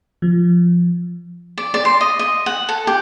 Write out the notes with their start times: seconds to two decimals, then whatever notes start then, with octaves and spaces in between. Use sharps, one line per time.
0.22 F3
1.58 D5
1.74 D5
1.85 C6
2.01 D#5
2.19 D#5
2.46 F#5
2.69 A4
2.87 G4